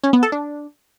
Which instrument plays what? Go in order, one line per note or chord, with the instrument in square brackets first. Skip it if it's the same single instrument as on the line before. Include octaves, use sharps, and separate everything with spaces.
[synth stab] C#4
B3
A4
D4